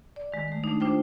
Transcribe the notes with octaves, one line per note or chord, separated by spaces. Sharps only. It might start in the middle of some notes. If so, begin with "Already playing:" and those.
D5
D#3 G#3
D#3 A3
A3 D4 D#4
D4 F4 C5 G5